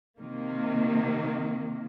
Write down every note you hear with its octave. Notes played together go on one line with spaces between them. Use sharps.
C3 D#3 A#3